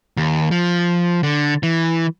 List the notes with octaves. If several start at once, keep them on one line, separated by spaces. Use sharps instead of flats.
D#2
F3
D3
E3